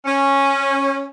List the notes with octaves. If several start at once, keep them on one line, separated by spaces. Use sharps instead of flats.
C#4